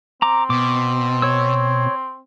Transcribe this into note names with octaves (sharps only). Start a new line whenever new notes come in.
C4 A#5 D6
B2 D6
C#5 E6